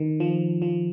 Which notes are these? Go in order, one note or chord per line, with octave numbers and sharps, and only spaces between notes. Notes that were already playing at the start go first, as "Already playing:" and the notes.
Already playing: D#3
F3
F3